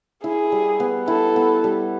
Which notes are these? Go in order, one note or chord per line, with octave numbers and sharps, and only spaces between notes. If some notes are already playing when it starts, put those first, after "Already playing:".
E4 G#4
G3
B3
E4 A4
B3
G3